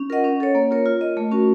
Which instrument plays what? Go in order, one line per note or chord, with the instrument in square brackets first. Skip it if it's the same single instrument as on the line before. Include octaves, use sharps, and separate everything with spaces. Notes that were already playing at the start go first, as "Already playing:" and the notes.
Already playing: [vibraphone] C#4
F4 A#4 D#5 F#5
C#4
A4 C#5
A#3
F4 A#4 C#5
F4
A#4 D#5
A3
C#4 F#4 A#4